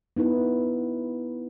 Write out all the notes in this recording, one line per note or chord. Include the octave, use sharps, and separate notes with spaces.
B3 D#4 E4 B4